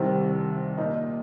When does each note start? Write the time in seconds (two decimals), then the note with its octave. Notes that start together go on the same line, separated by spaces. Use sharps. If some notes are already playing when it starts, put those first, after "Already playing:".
Already playing: C2 C3 D#3 C4
0.78 A#2 A#3 D#4